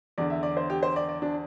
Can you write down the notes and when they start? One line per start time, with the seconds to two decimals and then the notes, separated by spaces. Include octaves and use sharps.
0.18 E2 D3 D5
0.30 E5
0.43 D5
0.57 C5
0.70 G4
0.83 C5
0.96 D5
1.09 D5
1.22 D4